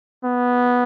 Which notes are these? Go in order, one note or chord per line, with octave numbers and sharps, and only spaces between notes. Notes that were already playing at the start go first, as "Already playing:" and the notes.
B3